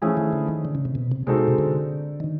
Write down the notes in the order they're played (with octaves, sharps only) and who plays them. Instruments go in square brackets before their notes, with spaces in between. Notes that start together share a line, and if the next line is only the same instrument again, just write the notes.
[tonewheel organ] E3 [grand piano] F3 A3 C#4 E4 G#4
[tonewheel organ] D#3
D3
D#3
D3
C#3
C3
B2
C3
[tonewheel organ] C3 [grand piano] G#3 C4 D#4 F#4 A4
[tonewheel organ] B2
C3
D3
D#3